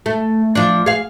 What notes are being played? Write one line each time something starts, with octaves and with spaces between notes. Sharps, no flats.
A3
F3 D4
G#4 F5